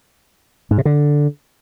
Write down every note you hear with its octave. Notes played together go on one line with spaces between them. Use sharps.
G#2
C3
D3